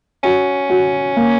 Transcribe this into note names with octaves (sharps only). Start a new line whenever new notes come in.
C#4 F#4
F#4
A#3